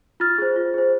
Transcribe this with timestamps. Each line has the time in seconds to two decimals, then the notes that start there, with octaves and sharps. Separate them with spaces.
0.20 F4 F6 A6
0.38 G#4 C5
0.56 F4
0.74 G#4 C5